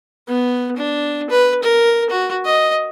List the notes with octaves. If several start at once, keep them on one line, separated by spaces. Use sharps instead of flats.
B3
D4
B4
A#4
F#4
D#5